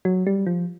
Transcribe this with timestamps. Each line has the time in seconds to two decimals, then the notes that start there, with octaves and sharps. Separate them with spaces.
0.05 F#3
0.27 G3
0.47 F3